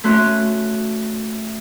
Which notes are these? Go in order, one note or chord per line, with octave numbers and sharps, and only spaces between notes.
A3 C#4 F#4 C6 F#6